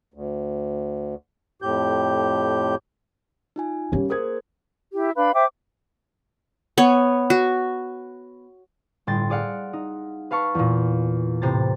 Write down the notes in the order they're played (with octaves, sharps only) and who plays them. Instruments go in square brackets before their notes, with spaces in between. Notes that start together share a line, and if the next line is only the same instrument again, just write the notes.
[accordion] D2
F2 A2 G4 G6
[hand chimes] D#4 F4 G#5
[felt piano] G3 C#4 G4 [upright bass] A#3 E4
[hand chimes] G#4 A#4 C5 [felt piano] D#6 G#6
[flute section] E4 G4
D4 B4 F5 B5
C5 E5 G5 D6
[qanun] B3 C#5
F#4
[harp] G1 A2 G5 C6 A6
G#4 D5 F5 F#5
D#4
B4 F5 A5 C#6
E2 A#2
A2 C3 C5 A#5 A6